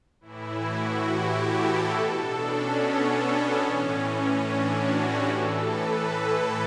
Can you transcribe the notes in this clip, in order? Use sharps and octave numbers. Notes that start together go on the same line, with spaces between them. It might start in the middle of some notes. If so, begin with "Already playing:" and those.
A2 E3 E4
F#4
G4
A4
B2 A4
D4
C#4
B3
B3
A2 E3 C#4
D4
F#4
G4
A2 E3 A4
B4
A4